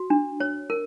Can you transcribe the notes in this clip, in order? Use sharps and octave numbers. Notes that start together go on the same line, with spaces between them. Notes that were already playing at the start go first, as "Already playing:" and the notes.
Already playing: F#4
D4
C#5
A#4